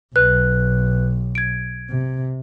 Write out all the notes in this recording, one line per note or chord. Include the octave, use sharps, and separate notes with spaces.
B1 B4 F#6
G#6 D7
C3